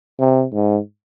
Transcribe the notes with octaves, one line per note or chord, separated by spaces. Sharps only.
C3
G#2